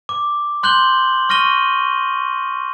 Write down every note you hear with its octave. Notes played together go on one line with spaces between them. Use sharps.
D6
C6 F#6 G6 F#7 G7
C#6 F6 A#6 D#7 G7